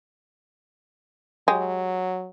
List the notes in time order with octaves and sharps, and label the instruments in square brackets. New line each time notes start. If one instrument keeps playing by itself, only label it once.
[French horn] F#3 [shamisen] G#3 G4